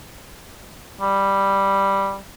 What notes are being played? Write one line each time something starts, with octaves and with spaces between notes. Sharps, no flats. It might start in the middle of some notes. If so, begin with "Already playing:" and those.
G3